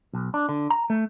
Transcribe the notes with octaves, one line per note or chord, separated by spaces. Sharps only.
B1
D4
D3
A#5
A3